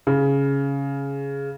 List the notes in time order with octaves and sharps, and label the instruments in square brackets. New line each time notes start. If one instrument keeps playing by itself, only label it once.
[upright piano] C#3